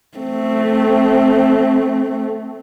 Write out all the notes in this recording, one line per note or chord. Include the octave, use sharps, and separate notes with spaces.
A3 C4